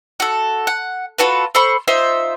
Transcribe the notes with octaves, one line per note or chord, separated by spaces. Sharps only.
F#4 A4
F#5
F4 F#4 A4 B4
A4 C5 B5 C#6
D#4 F4 C5 E5